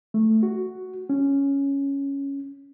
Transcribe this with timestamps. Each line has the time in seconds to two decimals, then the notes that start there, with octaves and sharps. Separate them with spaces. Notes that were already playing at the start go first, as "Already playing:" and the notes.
0.14 A3
0.43 F#4
1.09 C#4